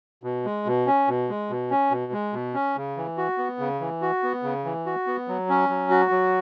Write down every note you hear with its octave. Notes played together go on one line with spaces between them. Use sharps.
B2
G#3
B2
C#4
B2
G#3
B2
C#4
B2
G#3
B2
C#4
C#3
E3
F#4
B3
C#3
E3
F#4
B3
C#3
E3
F#4
B3
F#3
C#4
F#3
F#4
F#3